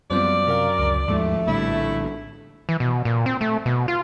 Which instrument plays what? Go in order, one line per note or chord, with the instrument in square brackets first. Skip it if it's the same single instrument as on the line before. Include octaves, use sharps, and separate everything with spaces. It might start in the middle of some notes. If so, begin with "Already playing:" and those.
[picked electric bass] F#2 [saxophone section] F3 [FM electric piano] G3 B3 C4 [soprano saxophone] D5
[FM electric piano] C3 F5 [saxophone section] A#4
[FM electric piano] C#2 D3
[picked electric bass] D#2 G#2 G#3 [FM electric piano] F3 [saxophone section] A3
[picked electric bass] A#1 A2 D3 [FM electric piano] G3 [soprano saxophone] E4
[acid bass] E3
B2
A#2
C4
A3
B2
F4